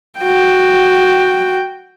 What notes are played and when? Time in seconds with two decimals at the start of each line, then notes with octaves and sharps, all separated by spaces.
0.19 F#4 G5